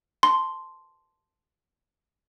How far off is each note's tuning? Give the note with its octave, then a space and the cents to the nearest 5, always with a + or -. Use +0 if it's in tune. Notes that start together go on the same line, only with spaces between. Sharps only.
A5 +0 C6 +0